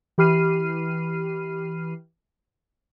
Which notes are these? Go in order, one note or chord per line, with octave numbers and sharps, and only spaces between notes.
E3 G4 B5 F6 C7 D#7